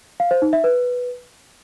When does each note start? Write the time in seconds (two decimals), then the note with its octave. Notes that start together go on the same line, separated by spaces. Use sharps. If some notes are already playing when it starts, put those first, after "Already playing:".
0.20 F5
0.31 C5
0.42 D#4
0.53 E5
0.64 B4